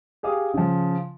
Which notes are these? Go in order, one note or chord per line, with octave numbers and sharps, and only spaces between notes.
G4 G#4 F5 D#6
C#3 F3